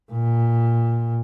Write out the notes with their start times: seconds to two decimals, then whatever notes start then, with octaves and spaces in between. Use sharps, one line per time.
0.12 A#2